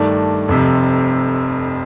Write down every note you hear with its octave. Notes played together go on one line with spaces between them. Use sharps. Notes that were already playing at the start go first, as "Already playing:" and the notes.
Already playing: G2 D#3 A3 D4
F1 F2 C3